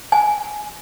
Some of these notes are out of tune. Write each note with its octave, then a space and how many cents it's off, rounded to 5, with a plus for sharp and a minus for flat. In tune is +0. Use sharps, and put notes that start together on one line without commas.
G#5 +10